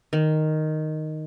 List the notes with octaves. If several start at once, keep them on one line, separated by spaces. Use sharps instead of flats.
D#3